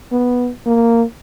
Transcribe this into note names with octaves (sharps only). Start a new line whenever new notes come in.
B3
A#3